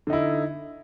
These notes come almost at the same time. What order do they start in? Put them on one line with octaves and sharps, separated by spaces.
D3 D#4 E4